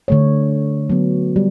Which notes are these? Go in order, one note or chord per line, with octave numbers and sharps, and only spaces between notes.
D3 A3 C#5
F#3 B3
G3